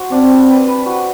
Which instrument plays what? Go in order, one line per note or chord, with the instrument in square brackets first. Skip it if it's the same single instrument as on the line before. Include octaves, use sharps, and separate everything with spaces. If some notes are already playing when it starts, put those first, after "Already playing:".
Already playing: [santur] F#4 C5
[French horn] C4 [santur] D4
[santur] G3
B4
B4
F#4